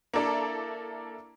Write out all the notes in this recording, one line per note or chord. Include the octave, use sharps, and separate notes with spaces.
A#3 D4 E4 A4 D5